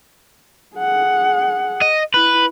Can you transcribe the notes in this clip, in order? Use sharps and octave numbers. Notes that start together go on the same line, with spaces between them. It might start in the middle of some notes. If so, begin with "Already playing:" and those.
G#4 F#5
D#5
E4 B4